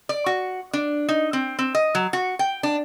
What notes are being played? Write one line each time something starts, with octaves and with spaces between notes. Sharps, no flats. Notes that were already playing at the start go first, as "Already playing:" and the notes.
D5
F#4
D4
D#4
C4
C4
D#5
F#3
F#4
G5
D4